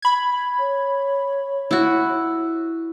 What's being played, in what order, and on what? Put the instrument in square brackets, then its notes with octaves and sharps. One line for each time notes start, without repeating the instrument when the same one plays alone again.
[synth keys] B5 G#6
[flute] C#5
[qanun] E4 F#4